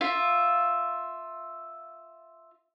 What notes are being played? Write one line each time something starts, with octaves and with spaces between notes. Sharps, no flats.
F4 E5